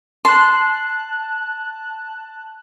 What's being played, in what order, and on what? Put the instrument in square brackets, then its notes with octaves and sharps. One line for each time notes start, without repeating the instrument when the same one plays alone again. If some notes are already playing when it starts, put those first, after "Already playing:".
[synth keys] A5 F#6 [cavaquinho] C6